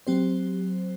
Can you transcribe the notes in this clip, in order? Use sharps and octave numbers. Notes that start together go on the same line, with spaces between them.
F#3 C4 G4 C5